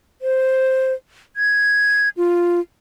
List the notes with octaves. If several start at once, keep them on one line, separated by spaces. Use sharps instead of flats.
C5
G#6
F4